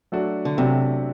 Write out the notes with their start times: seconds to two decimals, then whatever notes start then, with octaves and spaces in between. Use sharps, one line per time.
0.12 F#3 A3 D4 F#4
0.45 D3
0.57 C3 F#3 A3 D4 F#4